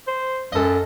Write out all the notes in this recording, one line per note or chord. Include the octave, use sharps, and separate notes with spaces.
C5
F#2 A4 D#5